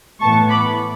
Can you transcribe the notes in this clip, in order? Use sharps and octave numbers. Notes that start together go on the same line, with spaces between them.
A2 E3 B3 A5 C#6
B5 D6